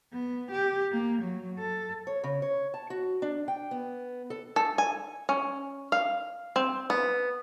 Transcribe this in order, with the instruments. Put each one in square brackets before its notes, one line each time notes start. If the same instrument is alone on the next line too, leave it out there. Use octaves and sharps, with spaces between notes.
[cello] B3
G4
A#3
F#3
A4
[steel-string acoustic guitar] C#5
C#3
C#5
A5
F#4
D4
G5
B3
A4
[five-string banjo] A4
G#5
C#4
F5
C4
B3